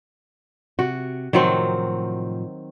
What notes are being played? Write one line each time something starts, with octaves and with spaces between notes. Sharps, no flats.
C3 F#4
A2 C3 D#3 F3 F#3 C4